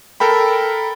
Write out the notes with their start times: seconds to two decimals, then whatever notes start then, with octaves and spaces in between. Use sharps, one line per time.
0.20 A4 A#4 G5 B5